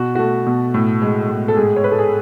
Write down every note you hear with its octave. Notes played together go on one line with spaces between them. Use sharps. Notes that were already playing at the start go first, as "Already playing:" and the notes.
Already playing: B2 F#4
A3 F#4
B2
A2
G#3
A2
A4
G#2 G#4
C#5
G#2 B4
A4
G#4